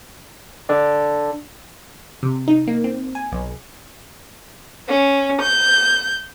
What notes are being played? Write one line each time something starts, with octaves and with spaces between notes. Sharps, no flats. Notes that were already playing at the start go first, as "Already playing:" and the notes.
D4 A4 D5
C3
D#4
A#3
C4
G#5
B1
C#4
G6